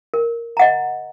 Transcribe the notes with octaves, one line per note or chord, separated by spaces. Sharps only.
A#4
D#5 F#5 A#5